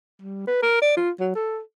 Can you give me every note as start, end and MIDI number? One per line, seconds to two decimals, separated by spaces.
0.22 0.46 55
0.47 0.60 71
0.62 0.79 70
0.82 0.95 74
0.97 1.10 65
1.20 1.33 54
1.35 1.60 69